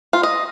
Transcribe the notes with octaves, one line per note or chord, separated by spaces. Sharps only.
F4
D#5